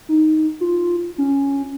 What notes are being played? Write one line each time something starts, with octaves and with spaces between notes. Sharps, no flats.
D#4
F4
C#4